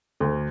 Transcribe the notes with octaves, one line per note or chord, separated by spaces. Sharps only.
D2